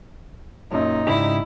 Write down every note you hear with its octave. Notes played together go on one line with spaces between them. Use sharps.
F#2 A#2 F#3 D#4
G#2 C#3 D4 E4 G4